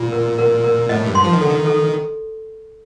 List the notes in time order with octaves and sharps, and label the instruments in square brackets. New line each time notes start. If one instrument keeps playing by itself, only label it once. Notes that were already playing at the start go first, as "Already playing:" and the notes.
Already playing: [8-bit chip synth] A#2 [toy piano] F4
[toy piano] A#4
A#4
A#4
[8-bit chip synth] A2 [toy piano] D#5
[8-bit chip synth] G2
[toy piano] C6
[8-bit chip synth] F3
D#3
[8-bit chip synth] D3 [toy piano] A4
[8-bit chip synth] D#3
[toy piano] A4